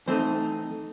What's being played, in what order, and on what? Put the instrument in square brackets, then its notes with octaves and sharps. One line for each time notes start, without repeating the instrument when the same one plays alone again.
[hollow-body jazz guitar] E3 A3 C4 D#4 C5